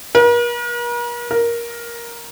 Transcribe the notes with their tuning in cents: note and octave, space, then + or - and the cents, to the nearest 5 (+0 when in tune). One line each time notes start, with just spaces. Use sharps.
A#4 +45
A#4 +10